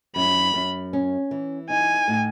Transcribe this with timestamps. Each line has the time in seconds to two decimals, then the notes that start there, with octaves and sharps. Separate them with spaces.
0.16 F#2 B5
0.54 F#2
0.93 C#4
1.31 E3
1.70 D#4 G#5
2.08 A2